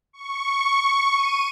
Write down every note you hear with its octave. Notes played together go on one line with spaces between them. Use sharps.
C#6
D#7